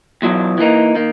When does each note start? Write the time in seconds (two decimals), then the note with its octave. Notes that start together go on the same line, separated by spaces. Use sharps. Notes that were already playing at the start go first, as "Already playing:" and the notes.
0.22 E2 B2 F#3
0.58 E3 A#3 D#4
0.95 D#3 A#3